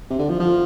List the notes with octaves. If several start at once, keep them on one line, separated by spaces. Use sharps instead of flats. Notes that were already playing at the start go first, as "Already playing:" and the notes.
C3
D3
F3
F3